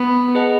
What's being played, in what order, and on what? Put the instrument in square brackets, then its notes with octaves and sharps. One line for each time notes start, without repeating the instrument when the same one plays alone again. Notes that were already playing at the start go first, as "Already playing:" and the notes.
Already playing: [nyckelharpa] B3
[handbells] G#4 B4 D#5 F#5 A5